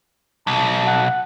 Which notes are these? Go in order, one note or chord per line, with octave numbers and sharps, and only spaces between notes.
B1 A5
F#5